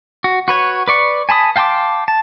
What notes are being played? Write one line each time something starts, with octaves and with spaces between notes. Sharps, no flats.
F#4
F#4 B4 C#5
B4 D5 C#6
G#5 A5 B5 D#6
F5 G5 A5 C6 D6
A5